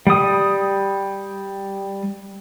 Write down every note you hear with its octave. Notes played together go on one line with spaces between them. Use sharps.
G3 D#6